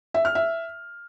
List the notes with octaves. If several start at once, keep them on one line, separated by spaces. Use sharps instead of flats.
E5
F6
E5